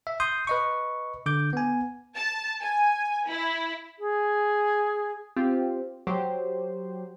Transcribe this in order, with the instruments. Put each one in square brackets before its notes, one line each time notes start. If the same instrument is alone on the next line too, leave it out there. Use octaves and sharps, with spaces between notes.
[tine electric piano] E5
C6 D#6 G6
B4 D#5 C#6
D3 D6 G6
B3 G#5
[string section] A5
G#5
E4
[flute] G#4
[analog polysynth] C4 F4 G4
F#3 G4 C5